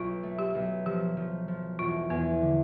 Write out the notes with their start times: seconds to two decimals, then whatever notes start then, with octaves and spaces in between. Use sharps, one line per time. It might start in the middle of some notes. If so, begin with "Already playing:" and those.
Already playing: B1 F4
0.23 A3
0.39 G4
0.55 B1
0.86 F3 G4
1.17 F3
1.48 F3
1.79 E1 F4
2.10 E2 B3
2.41 D3